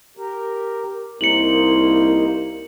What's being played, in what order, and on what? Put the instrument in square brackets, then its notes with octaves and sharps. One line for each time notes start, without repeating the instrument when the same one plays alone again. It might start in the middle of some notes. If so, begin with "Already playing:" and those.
[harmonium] G4 A#4
[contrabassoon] C2 [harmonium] A#3 D#4 C5 [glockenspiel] C#7 F#7